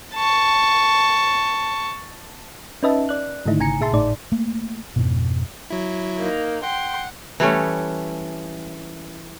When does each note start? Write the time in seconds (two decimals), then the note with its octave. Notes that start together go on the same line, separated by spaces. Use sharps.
0.14 A5 C#6
2.83 C#4 D#4 B4 D#5 E5 A5
3.09 D5 F#6
3.46 G#2 D3 D#3 A3 D#4 E4
3.59 G#1 C#3 G#5 A#5 C#7
3.81 A#2 G#4 E5 A5 C6
3.93 G#1 A2 D#4 D5
4.32 A3 A#3
4.96 F2 G#2 B2
5.70 F#3 E4
6.18 A#3 D#4
6.63 F#5 G5 C6
7.40 E3 G3 A3 C#4